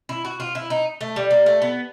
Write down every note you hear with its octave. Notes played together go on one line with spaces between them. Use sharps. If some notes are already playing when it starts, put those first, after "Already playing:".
E4
F#4
F4
E4
D#4
A3
G3
A#3
A3
B3